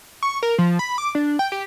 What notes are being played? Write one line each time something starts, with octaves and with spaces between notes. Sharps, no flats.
C#6
A#4
F3
B5
D6
D4
G5
G4